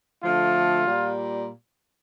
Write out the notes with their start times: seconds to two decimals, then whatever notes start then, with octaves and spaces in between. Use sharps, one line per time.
0.23 D3 F3 A3 F4
0.86 A#2 G3